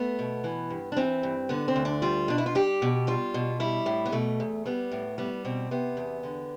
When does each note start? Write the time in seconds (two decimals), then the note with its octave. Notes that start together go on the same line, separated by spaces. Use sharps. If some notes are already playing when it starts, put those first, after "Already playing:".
Already playing: A3 B3
0.19 B2
0.44 E3
0.70 G2
0.92 D4
0.97 E3 C4
1.23 G2
1.49 D3 B3
1.68 C4
1.76 D2
1.85 D4
2.02 G3 F4
2.28 B2 D4
2.38 E4
2.46 F4
2.55 G3 G4
2.82 B2
3.07 G3 F4
3.34 B2
3.60 G3 E4
3.86 A2
4.05 B3
4.12 B2 A3
4.40 E2
4.66 G3 B3
4.91 A2
5.18 G3 B3
5.45 B2 C4
5.71 C3 B3
5.97 E2
6.23 D3